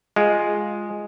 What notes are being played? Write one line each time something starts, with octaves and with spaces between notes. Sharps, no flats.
G#3 F4